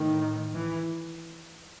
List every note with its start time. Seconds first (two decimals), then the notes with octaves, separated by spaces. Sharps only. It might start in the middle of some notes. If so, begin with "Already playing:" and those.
Already playing: A2 D#3
0.54 E3